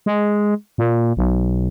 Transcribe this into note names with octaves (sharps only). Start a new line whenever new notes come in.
G#3
A#2
B1